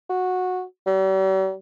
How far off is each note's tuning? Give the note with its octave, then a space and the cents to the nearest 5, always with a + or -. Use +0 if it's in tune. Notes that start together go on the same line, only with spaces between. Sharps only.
F#4 -15
G3 -45